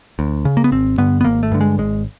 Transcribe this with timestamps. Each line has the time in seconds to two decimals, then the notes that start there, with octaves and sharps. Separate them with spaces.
0.19 D2
0.45 C#3
0.57 A#3
0.64 B3
0.72 G#1 C4
0.98 G2 D3 B3
1.21 B3
1.24 G#1 A#3
1.43 A3
1.52 G2 D3
1.61 G#3
1.78 G#1 G#3